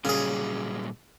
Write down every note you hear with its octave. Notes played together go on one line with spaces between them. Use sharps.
A#2 C#3 F#3 G3 G#4